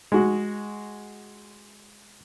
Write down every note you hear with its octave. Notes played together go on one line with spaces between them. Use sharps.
G#3 F#4